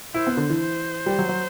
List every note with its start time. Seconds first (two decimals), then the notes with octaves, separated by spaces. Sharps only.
0.14 E4 C5
0.27 B3
0.37 D3
0.50 E3
0.60 C5
1.06 G3
1.18 F#3
1.29 F#3